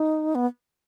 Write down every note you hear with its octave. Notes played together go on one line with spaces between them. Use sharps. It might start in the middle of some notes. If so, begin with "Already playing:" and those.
Already playing: D#4
B3